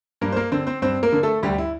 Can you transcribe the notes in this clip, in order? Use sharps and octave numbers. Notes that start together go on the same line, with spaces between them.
G2 A#3 A#4
C5
A#3 A#4
D3 C4 C5
C4 C5
G2 C4 C5
A#3 A#4
D3
A3 A4
D2 G3 G4
E4